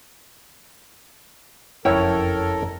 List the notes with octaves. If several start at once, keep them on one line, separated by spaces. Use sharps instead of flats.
F#1 F2 C#4 E4 A4 A#4 C#5 G5